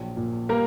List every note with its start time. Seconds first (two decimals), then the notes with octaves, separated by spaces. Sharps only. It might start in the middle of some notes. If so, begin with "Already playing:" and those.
Already playing: A#1 F#3
0.17 A#2
0.49 G3 A#3 A#4